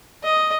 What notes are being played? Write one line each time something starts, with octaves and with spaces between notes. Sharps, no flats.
D#5